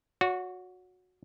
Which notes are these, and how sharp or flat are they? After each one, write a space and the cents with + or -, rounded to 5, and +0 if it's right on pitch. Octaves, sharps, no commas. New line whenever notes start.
F#4 -20 C#5 +30